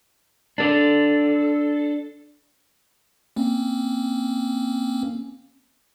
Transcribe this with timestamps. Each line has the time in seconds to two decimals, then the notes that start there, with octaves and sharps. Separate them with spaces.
0.58 D4 A4
3.36 A#3 C4 C#4